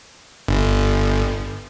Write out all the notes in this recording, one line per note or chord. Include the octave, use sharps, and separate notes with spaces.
G1